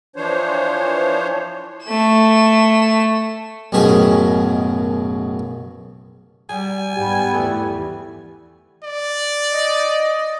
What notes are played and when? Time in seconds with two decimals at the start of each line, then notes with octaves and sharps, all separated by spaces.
0.16 E3 F3 D4 C5 C#5
1.85 A3 E7
3.72 A1 F#2 B2 D#3 G#4 D#5
6.49 G3 G#5
6.96 G#2 G3 B3 G4
7.34 E2 E3 A3
8.84 D5
9.51 D#5